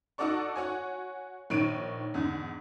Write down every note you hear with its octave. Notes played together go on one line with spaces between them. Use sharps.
D#4 F#4 A4 D5 C#6
F#4 C#5 G#5
A#1 D#3 C#5 D7 D#7
E2 G#2 D3